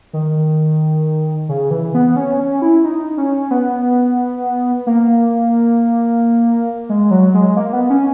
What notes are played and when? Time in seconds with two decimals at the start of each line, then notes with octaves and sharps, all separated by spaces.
0.13 D#3
1.49 C#3
1.71 E3
1.94 B3
2.16 C#4
2.39 C#4
2.62 E4
2.84 D#4
3.18 C#4
3.51 B3
4.87 A#3
6.89 G#3
7.11 F#3
7.34 G#3
7.57 A#3
7.73 B3
7.90 C#4